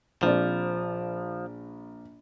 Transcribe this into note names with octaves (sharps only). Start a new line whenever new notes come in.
A#1 F3 C4 D5